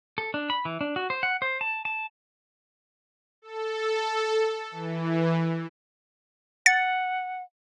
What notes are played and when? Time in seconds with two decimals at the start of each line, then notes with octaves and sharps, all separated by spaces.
0.18 A4
0.34 D4
0.50 B5
0.65 E3
0.81 D4
0.96 F#4
1.10 C5
1.23 F#5
1.42 C5
1.61 A5
1.85 A5
3.42 A4
4.71 E3
6.66 F#5 A6 C#7